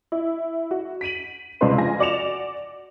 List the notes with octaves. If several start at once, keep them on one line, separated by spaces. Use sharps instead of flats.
E4
F#4
B6 D7 D#7 F#7
C#2 C3 C4 D4 B4 C6
F2 F4 G#5 A#6
F#4 D5 D6 C#7 E7 F7